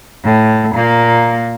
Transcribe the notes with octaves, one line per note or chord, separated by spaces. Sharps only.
A2
A#2 A#3